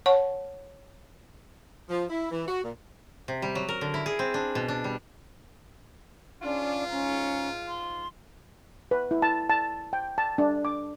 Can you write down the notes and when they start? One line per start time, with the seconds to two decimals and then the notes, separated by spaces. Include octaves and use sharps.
0.06 C#5 F#5 A5 C#6
1.89 F3
2.10 E4
2.30 E3
2.47 F#4
2.63 A#2
3.28 C3
3.42 G3
3.55 F#3
3.69 A#4
3.81 D3
3.94 E4
4.06 G#4
4.19 C4
4.34 D4
4.55 B2
4.68 D4
4.84 G3
6.41 G#2 C#4 D4 F4
6.90 C#4 A#5
7.68 C6
8.91 B4
9.11 E4
9.22 A5
9.50 A5
9.93 G5
10.18 A5
10.38 D4
10.65 D6